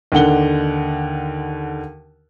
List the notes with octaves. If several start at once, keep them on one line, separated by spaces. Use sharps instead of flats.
D#2 D3 F#5 G7